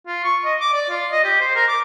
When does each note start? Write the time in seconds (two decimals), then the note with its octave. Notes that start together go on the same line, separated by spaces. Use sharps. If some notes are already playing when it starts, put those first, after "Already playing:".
0.07 F4
0.24 C#6
0.45 D#5
0.61 D6
0.73 D5
0.90 F4
1.12 D#5
1.24 G4
1.41 C5
1.55 A#4
1.68 D6